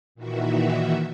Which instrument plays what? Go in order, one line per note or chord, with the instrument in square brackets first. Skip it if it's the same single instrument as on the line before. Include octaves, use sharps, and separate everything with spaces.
[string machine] A#2 D#3 E3 F#4 E5